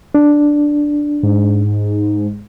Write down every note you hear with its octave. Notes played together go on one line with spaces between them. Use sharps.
D4
G#2